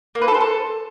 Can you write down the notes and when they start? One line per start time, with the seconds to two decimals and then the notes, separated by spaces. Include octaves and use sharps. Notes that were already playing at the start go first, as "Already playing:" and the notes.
0.15 A#3
0.22 B4
0.28 A4
0.34 C5
0.41 A4